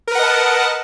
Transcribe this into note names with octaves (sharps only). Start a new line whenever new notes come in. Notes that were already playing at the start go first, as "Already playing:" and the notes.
A#4 B4 D#5 F#5 A5